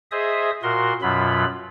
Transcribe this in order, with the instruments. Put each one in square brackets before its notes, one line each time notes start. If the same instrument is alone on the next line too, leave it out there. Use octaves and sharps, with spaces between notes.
[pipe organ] G#4 C5 D#5 E5 D#6
A#2 F#4 A#4 C6
F#2 B2 F#3 F4 B5